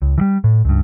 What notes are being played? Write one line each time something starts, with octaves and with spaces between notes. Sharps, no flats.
C#2
E3 G3
A2
C#2 G2